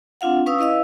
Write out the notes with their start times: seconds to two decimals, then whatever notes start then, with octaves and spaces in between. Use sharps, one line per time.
0.21 C4 D4 F4 F5 F#5
0.46 C#4 B4 F5 D#6 E6
0.59 E4 B4 D#5 F5 E6